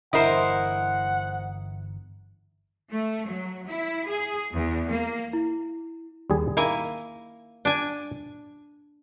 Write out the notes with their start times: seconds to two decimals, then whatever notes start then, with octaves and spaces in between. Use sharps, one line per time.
0.13 G1 G2 E3 E4 A#4 C5 D#5 F#5
2.93 A3
3.29 F#3
3.69 E4
4.08 G#4
4.55 E2
4.91 A#3
5.33 E4
6.30 D#2 G3 G#4
6.57 D#3 A#3 E4 G#5
7.65 D4 G#5